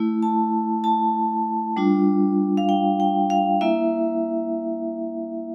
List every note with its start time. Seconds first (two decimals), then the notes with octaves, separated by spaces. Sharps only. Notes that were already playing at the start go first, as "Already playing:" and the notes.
Already playing: A3 E4
0.22 A5
0.84 A5
1.76 G3 D4 F4
2.57 F5
2.69 G5
3.00 G5
3.30 F5
3.61 A#3 E4 E5